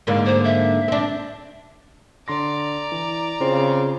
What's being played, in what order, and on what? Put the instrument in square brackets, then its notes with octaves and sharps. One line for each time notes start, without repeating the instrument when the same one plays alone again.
[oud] G#2 D3 A#3
[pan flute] C5
E5
[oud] C4 D4
[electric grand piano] D3 C6 A#6 [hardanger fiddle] D5 A#5
[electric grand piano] E3
[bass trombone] C#3 [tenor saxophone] C4 [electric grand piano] F4